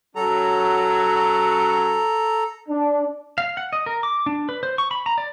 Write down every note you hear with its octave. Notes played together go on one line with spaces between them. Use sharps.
F#3 C#4 A4 A#5
D4
F5
F#5
D#5
A#4
D6
D4
B4
C5
C#6
B5
A#5
D5